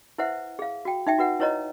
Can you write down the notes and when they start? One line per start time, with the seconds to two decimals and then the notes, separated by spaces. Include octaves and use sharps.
0.18 E4 B4 C5 E5 F#5
0.59 G#4 F5
0.85 F#4 G5
1.07 D#4 E5 G5
1.18 F#4 B4 F#5
1.40 E4 B4 C#5 D#5 A#5